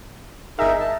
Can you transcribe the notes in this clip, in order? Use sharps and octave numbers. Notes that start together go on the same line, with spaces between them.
G1 D#4 G#4 A#4 E5
A5